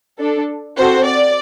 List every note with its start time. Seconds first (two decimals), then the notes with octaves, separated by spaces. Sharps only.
0.18 D4 A4
0.77 C4 F#4 A4 C5
1.06 D5